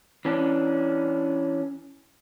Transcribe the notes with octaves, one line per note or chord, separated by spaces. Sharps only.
E3 C#4 D4